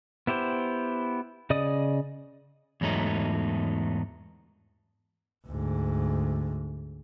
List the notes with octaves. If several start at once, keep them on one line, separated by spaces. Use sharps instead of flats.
B3 E4 G4 C5
C#3 D5 D#5 D#6
E2 G#2 F#3 A3 D#4
D2 G#2